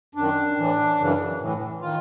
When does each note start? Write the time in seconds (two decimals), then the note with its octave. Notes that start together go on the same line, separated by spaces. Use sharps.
0.15 F#2 D#3 D4
0.56 A2 E3
0.98 F#2 C#3 E3
1.39 A2 E3
1.81 D#3 F4